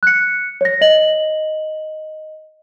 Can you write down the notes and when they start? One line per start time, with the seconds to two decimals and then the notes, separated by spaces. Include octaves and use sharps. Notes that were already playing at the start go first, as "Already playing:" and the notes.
0.03 F#6 C#7
0.61 C#5 A#6
0.81 D#5 F#7